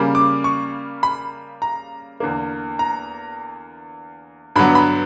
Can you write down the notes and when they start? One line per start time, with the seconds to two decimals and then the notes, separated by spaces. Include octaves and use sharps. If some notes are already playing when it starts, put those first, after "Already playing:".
Already playing: C#3 G3 A#3
0.15 D6
0.44 C#6
1.03 B5
1.62 A#5
2.20 E2 D3 A#3
2.79 A#5
4.56 G2 D3 F#3 B3 B5
4.75 B5